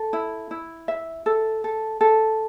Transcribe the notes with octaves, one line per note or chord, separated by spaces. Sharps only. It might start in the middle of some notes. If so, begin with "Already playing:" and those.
Already playing: A4
E4
E4
E5
A4
A4
A4